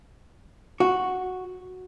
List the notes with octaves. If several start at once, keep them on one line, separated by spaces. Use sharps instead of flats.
F#4